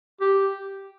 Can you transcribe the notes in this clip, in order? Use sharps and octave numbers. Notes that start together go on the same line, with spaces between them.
G4